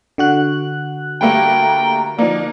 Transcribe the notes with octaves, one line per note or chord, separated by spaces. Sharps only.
D3 F#4 F#6
G3 A3 A#3 G5 A#5
F3 A#3 D#4 D5